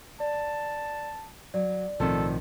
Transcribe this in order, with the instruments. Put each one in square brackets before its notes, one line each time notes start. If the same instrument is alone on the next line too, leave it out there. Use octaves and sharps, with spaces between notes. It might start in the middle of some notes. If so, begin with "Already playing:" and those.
[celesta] D5 [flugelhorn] A5
[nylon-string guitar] F#3 [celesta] D5
[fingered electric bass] B1 C4 [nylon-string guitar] A2 D#3 F3 [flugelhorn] A4